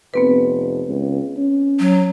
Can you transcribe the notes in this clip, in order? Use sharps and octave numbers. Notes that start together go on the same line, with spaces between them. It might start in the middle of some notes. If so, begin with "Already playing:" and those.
F1 B3 C4 B4
C#2
C#4
F#3